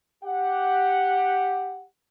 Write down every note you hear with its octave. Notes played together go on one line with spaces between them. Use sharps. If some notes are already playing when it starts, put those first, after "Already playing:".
G4 F#5